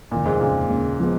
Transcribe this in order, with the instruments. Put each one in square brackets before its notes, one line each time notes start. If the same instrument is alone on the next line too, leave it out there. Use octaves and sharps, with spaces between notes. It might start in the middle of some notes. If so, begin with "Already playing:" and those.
[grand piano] F1 D#2 D#3 A#3 [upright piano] A#2
[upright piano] G#2
[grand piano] F1 D#2 C#3 [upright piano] A#2
[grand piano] D#2 C#3 G#3
F3 G#3 B3